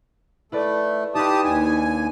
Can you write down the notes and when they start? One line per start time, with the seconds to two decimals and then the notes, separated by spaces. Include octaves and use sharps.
0.52 A3 E4 B4 D5
1.15 D#4 F4 G4 B4 A5 D#6
1.44 D#2 D4 D#4 G#5